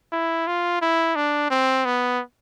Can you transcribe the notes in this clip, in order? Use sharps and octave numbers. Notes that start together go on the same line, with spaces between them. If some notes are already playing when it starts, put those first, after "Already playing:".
E4
F4
E4
D4
C4
B3